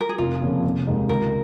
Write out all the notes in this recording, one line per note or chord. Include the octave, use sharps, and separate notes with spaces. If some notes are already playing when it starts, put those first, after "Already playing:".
A#4
G#4
F1 F4
F2 C#3 F3 A#3
F1
D#2 D#3 G#3 D#4
C#2 A#4